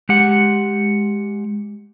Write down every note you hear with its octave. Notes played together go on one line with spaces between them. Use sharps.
G#3 G4 F#5